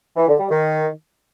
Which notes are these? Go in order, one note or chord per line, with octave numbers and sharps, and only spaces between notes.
E3
D3
G3
D#3